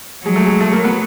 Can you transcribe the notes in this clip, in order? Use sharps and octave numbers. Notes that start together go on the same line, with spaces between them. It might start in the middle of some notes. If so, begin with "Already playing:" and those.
F#3 G#3
A3
G#3
A3
A#3
B3